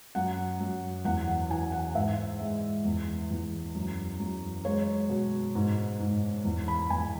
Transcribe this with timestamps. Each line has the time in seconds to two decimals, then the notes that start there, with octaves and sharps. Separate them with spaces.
0.15 F#2 F#5
0.60 F#2
1.05 E2 F#5
1.28 F#5
1.50 E3 G#5
1.72 F#5
1.95 G#2 E5
2.40 G#3
2.85 E2
3.31 E2
3.75 F#2
4.20 F#2
4.65 G#3 C#5
5.09 B2
5.55 G#2
6.00 G#2
6.44 E2
6.68 B5
6.90 E2 G#5